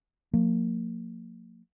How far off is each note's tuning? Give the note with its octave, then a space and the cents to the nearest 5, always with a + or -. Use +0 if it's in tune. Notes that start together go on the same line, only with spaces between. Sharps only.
F3 +40 A#3 -25